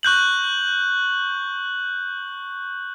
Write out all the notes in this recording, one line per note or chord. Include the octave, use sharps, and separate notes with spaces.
C#6 F#6 G6 F#7